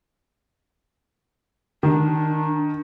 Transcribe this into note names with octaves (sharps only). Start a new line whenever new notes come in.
D#3 D4